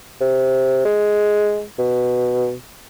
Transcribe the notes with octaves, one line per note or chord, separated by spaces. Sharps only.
C3
G#3
B2